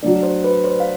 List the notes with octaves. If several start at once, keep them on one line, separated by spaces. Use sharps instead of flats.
F#3 A3 D4
C5
B4
C5
F5